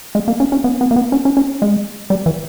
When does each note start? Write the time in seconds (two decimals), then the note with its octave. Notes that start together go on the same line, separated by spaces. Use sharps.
0.15 G#3
0.28 A#3
0.40 C#4
0.52 C#4
0.64 B3
0.81 B3
0.91 A#3
0.96 B3
1.12 C#4
1.25 C#4
1.37 C#4
1.62 G#3
2.10 G3
2.26 E3